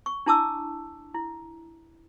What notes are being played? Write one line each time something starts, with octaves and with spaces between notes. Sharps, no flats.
C#6
D4 E4 A5 D6 E6
E4